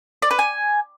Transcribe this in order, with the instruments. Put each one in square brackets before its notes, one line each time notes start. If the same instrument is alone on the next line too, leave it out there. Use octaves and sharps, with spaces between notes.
[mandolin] D5
B4
G#5